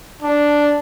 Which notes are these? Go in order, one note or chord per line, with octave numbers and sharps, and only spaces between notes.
D4